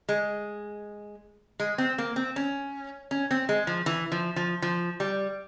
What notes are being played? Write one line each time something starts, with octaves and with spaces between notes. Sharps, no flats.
G#3
G#3
C4
A#3
C4
C#4
C#4
C4
G#3
F3
E3
F3
F3
F3
G3